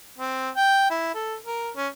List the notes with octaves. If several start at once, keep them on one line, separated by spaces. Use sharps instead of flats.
C4
G5
E4
A4
A#4
C#4